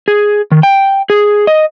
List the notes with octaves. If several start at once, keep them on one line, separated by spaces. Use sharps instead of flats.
G#4
D#3
G5
G#4
D#5